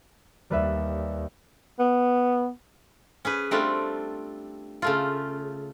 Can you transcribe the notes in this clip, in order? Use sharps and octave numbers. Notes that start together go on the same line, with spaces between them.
D#2 G3 B4 E5
B3
C#4 G#4 B4
G3 A3 C4 D4 F4
C#3 A3 F4